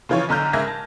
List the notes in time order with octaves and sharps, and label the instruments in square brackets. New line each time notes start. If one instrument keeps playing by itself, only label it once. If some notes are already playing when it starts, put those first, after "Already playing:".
[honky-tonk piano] C#3 E3 F3 F4 C#5
B1 D3 A#5 F6 G6
G#2 C#3 A#4 E5 G#6 A#6
A5